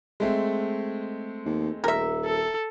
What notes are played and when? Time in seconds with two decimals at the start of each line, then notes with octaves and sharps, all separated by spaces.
0.20 G#3 A3 C4
1.46 D#2
1.84 D#1 A#4 E5
2.25 A4